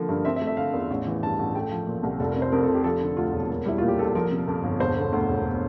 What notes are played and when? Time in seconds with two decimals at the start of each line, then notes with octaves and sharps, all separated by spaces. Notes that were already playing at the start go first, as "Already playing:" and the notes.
Already playing: D3 F3 A#3
0.09 G2
0.25 C4 E5
0.36 E5
0.41 A3
0.47 E5
0.57 D3 F5
0.74 E2
0.90 A1
1.07 E3
1.23 G2 A5
1.39 A1
1.55 A3 G5
1.71 F3
1.87 A#2
2.03 C2
2.20 F1 A4
2.30 A#4
2.36 C3
2.42 C5
2.52 F2 A#4
2.63 A4
2.69 F1
2.74 G4
2.84 F3 A4
3.01 D3
3.17 D2 F4
3.33 E1
3.49 A#3
3.65 G3 E4
3.78 A#2 F4
3.88 G4
3.99 A#1 A4
4.15 F3 A#4
4.31 C3
4.48 F2
4.63 G1
4.80 E1 C5
4.97 D3
5.12 D2
5.29 E1